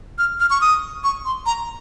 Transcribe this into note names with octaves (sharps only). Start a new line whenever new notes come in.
F6
F6
C#6
D#6
C#6
C6
A#5